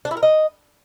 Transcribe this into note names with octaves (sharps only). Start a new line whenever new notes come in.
D4
E4
A#4
D#5